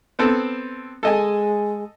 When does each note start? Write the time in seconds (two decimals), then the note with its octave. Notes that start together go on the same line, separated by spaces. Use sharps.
0.19 B3 C4 A4
1.03 G#3 A4 D#5 G#5